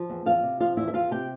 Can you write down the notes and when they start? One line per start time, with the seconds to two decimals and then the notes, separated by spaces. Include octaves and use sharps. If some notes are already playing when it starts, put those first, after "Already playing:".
Already playing: F3
0.10 E2
0.26 E2 F4 F5
0.43 C3
0.60 F3 F4 F5
0.77 E2 E4 E5
0.88 E5
0.93 E2 F4 F5
1.11 C3 G4 G5